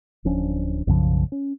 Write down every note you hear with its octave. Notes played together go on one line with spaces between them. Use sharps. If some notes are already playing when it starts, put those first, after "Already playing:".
D1 F3 C#4 D4
B1 F#2 C#3 F3
C#4